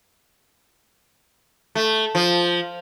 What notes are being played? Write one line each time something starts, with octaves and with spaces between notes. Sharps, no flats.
A3
F3